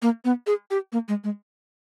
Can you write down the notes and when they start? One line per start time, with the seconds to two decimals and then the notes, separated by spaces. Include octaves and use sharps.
0.02 A#3
0.25 B3
0.47 G#4
0.71 G4
0.92 A#3
1.08 G#3
1.24 G#3